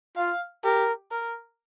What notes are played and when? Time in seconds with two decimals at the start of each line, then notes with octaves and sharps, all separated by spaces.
0.17 F4 F5
0.64 G4 A#4
1.11 A#4